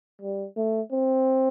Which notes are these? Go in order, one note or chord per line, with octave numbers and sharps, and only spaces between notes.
G3
A3
C4